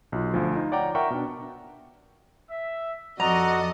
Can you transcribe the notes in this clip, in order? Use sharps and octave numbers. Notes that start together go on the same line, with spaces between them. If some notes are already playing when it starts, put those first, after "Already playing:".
B1 F4
D2 F3
D#4 F4
C#5 D5 F#5 G5 A#5 D6
A#4 E5 F#5 G5 A#5 C#6
B2 D4
E5
F2 F#4 A4 D5 D#5 A#5